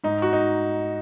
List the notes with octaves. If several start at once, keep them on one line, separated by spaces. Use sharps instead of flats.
G#2 D#4
F#4
D#4